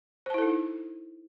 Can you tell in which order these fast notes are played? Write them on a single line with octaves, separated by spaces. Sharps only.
C5 A5 E4 A4 D#4